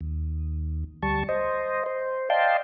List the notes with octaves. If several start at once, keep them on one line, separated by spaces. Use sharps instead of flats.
D#2
D2 G3 A5 C#6
C5 D#5
C5
D5 D#5 F5 G5 A5 C6